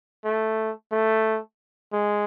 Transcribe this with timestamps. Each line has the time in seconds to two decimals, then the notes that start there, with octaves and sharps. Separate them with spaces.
0.25 A3
0.92 A3
1.93 G#3